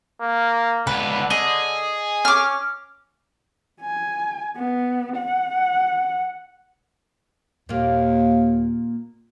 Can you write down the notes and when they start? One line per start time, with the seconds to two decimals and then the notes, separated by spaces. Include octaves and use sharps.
0.21 A#3
0.87 C#2 D3 B3 B4
1.30 G#4 D#5
2.25 C#4 D6 F6
3.81 G#5
4.56 B3
5.16 F#5
7.69 D#2 A#2 A#3